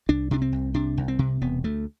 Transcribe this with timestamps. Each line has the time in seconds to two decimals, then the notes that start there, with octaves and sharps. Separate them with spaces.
0.09 C2 D4
0.31 C3 D4
0.42 C4
0.52 C2
0.74 C3 D4
0.97 C2
1.08 C4
1.19 C3
1.41 E1 B3
1.64 D2 A3